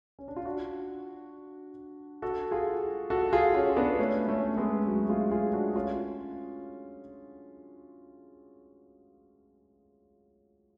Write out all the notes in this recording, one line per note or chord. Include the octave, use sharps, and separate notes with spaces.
C#4
D4
F4
D4 F#4
F#4 A4
F4 G#4
F#4 A4
F4 G#4
C#4 F4
B3 D4
A3 C#4
A3 C#4
G#3 B3
F#3 A3
F4 G#4
F4 G#4
D4 F#4
C#4 F4